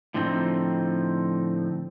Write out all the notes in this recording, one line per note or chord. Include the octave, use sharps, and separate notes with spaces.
A2 D3 F3 A3 C4 D#4